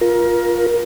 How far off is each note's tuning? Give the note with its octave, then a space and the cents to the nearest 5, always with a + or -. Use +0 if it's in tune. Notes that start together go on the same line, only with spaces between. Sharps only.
F4 +5 A#4 +25